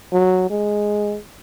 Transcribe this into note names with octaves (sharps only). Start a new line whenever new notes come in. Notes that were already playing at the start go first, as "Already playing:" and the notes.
F#3
G#3